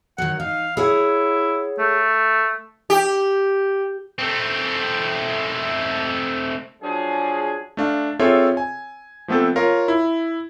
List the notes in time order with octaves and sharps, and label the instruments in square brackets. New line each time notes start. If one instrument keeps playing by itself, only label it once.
[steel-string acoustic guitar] D#3 F#3 [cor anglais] F#5
[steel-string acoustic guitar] D#4 [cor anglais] F5
[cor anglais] E4 [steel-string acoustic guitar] G#4 C#5 F#5
[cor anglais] A3
[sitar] G4
[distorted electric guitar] A3 C4
[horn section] F3 F#3 D4 G#4
[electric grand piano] A3 D4 F5
C4 F4 G#4 A4 C#5 E5
G#5
F3 A3 B3 C4 A4
F4 A#4 C#5 F5
E4